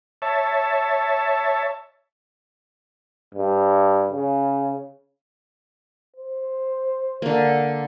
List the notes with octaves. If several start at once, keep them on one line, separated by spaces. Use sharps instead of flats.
C#5 E5 A5
G2
C#3
C5
D3 A#3